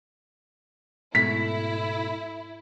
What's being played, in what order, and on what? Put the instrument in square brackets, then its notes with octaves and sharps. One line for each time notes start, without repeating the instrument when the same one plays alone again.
[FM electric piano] G#2 [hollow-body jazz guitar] B2 A3 [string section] E4 [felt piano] B6